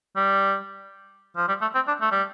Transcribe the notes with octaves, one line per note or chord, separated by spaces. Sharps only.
G3
F3
G3
A3
C4
D4
A3
G3